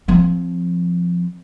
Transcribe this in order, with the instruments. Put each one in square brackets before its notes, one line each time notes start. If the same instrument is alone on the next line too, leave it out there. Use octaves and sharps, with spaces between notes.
[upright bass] F3 C4